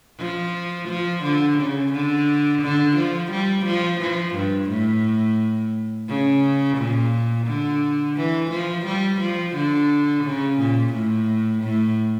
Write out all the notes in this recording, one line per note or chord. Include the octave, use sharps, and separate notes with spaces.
F3
F3
D3
C#3
D3
D3
F3
G3
F3
F3
G2
A2
C#3
A#2
D3
E3
F3
G3
F3
D3
C#3
A#2
A2
A2